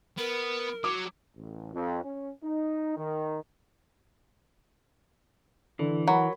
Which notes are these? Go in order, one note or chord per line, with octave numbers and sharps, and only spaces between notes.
B3 A#4
F#3 D6
A1
F2
C#4
D#4
D#3
D3 E3
F#3 A#4 F#5 B5